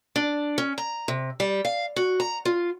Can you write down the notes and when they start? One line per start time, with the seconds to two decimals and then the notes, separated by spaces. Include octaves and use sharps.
0.16 D4
0.58 C#4
0.78 A#5
1.08 C3
1.40 G3
1.65 F5
1.96 F#4
2.20 A#5
2.45 F4